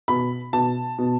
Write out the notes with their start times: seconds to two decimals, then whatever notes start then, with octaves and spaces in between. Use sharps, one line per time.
0.08 B2 B5
0.53 B2 A5
0.98 B2